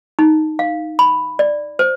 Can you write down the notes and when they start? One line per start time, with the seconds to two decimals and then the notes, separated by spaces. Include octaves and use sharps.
0.19 D#4
0.59 F5
0.99 B5
1.39 D5
1.79 C5